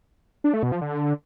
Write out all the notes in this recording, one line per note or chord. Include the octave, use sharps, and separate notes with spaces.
D4
A3
B2
F3
D3